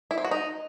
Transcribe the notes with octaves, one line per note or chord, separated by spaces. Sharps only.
E4
C4
F#4
D#4